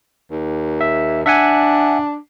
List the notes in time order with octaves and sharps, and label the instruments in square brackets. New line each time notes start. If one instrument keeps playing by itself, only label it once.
[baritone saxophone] D#2
[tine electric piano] E5
[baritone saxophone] D4 [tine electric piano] E5 F#5 G#5